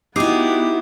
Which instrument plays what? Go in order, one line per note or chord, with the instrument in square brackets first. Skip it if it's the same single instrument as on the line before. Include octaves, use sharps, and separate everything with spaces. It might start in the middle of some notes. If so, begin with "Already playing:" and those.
[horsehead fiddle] B3 F#4 [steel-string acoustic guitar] D#4 E4 [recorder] G4 [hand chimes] D6 D#6 C7